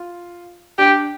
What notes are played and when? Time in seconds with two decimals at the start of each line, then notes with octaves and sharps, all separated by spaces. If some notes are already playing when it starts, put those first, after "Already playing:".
Already playing: F4
0.78 D4 G4